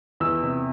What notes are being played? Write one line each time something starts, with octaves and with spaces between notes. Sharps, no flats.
E2 E6
C3